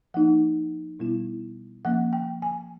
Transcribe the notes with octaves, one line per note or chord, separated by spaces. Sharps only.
F3 A#3 D#4 F#5
B2 G3 B3 E4
F3 A#3 C#4 F#5
G5
G#5